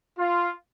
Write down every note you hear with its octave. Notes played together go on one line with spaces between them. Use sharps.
F4